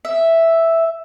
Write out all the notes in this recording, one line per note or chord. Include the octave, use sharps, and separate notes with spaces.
E5